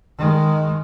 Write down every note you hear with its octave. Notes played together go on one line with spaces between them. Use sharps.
D#3 G#3